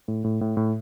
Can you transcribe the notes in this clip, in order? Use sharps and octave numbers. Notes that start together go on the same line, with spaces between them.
A2
A2
A2
A2